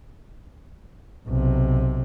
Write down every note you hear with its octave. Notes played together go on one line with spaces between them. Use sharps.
B1 C3